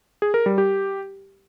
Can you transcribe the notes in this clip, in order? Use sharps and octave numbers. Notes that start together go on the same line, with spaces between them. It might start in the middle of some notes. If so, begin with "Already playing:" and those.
G#4
A#4
G3
G4